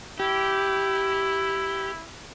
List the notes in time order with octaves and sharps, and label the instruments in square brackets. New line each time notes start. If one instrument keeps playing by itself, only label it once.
[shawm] E4 [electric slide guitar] G4